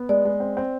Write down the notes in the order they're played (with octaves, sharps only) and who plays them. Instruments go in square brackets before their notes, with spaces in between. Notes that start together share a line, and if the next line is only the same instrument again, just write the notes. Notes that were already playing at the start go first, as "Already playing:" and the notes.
Already playing: [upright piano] B3
[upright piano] G#3 [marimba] D5
[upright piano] G#3
C4
C4